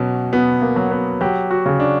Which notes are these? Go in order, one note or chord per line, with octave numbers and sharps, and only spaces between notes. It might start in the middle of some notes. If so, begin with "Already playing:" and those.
Already playing: B2 F#3 C#4
B2 B3
A#3
F#3
B3
F#3 G4
F#4
C#3
D4